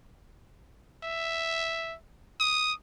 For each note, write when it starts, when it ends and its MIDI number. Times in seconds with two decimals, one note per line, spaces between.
1.03 1.96 76
2.40 2.73 87